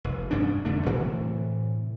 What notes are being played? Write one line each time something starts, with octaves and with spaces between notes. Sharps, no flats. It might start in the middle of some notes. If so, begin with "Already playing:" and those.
F1
D2 G2 C#4 D4
F2 D3 A3 D4
A2 C3 E3